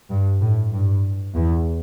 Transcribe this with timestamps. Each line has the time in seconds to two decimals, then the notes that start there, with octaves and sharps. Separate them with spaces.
0.10 G2
0.40 A2
0.72 G2
1.35 E2